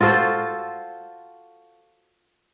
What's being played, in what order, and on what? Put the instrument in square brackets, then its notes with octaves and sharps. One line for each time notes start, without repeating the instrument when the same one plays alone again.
[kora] F4 F#4 A4 C5